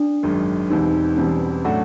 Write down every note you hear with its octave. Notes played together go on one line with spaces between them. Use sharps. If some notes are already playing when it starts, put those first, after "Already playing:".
Already playing: D4
G#1 F#2 D#3 G#3
E1 E2 B2 G3 C4 D#4
E1 E2 B2 G3 C4 C#4
A2 F#3 A3 D4 F#4